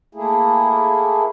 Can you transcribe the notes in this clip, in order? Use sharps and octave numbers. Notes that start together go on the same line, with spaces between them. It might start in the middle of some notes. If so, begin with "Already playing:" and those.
A3 A#3 E4 G#4